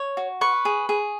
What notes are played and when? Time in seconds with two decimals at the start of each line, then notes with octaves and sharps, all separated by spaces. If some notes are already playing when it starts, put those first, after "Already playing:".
Already playing: C#5
0.17 F#4
0.41 B4 C#6
0.65 G#4
0.89 G#4